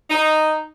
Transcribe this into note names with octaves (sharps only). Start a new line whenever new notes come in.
D#4